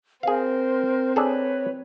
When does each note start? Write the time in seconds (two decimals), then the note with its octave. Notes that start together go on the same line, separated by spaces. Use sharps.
0.23 C4 G#4 A#4 C5 F5
1.16 D4 G#4 A4 B4 C#5 B5